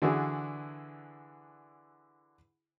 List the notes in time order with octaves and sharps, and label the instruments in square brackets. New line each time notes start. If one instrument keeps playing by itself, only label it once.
[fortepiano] D3 E3 D4 E4 F#4 G#4